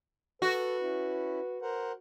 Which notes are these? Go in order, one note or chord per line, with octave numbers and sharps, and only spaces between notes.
F#4 A4 B4
C#4 E4
A#4 C5 F#5